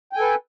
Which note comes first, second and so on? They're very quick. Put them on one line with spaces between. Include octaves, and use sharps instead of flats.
G5 G#5 A4 B4